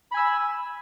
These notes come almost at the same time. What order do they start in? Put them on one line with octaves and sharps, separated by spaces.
B5 G#5 E6